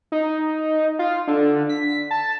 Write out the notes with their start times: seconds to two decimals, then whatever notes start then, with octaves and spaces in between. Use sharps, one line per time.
0.12 D#4
0.99 F4
1.28 D3
1.69 B6
2.11 A5